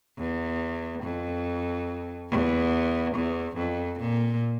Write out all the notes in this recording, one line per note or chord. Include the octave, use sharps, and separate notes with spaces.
E2
F2
E2
E2
F2
A#2